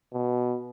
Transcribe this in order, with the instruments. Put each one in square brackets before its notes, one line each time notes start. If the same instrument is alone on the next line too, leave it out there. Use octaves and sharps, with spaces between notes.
[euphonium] B2